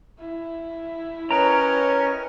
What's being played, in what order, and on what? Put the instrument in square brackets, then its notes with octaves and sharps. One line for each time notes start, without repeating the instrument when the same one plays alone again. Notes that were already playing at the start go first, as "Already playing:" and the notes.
[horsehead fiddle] E4
[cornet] C#4 [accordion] A#4 C#5 D#5 [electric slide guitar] B4 G5 A#5